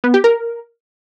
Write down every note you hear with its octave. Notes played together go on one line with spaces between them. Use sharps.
B3
G4
A#4